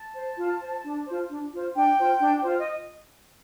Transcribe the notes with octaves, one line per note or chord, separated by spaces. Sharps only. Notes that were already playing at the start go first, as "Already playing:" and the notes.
Already playing: A5
C5
F4
C5
D4
F4 C5
D4
F4 C5
D4 G5
F4 C5
D4
F4 C5
D#5